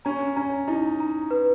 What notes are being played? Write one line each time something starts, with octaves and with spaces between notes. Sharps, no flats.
C#4 A#5
C#4 A#5
D#4 E4
A#5
B4